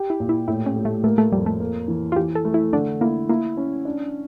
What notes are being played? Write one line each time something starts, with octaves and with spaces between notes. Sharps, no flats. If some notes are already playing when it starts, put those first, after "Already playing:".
Already playing: G4
E4
A#2
E4
A2 E4
C#4
A2
A3
A3 A#3
A3
F2 G3
A3
A#3
E3
F4
E3 G4
A4
A3
E4
D3 D4
A#3 E4
A#3 E4
C#4
D4